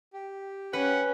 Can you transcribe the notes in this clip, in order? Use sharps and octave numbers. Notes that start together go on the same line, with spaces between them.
G4
C#4 B4 F#5